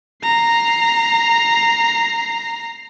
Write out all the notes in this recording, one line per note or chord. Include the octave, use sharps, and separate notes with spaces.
A#5 C7